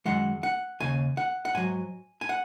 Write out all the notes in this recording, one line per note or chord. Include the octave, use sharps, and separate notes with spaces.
F#2 D#3 G#3 F#5
F#5
D#2 C#3 G#5
F#5
F#5
G#2 F#3 G#5
G#5
F#5